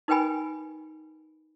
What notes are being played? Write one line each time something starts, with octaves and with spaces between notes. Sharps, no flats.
D#4 A#4 B4 G5 G#5 B5